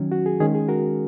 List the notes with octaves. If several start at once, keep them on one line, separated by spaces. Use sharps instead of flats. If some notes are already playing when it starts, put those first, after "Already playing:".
Already playing: D#3 F#3 C#4
F#4
G#4
D#3 G#3 C#4 G#4
G#4
F#4 A#4